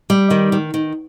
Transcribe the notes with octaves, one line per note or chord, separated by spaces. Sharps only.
G3
D#3
D#3
D#3